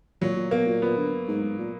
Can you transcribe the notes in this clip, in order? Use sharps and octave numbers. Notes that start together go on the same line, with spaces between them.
A#2 F#3
A#2
B2 A#3
A#2
A#2 B3
D3
G#2
G#2
A#2